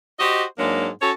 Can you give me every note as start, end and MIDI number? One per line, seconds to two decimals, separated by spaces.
0.19 0.44 66
0.19 0.44 67
0.19 0.44 72
0.19 0.44 75
0.59 0.89 44
0.59 0.89 54
0.59 0.89 56
0.59 0.89 58
0.59 0.89 62
1.01 1.11 61
1.01 1.11 66
1.01 1.11 69
1.01 1.11 73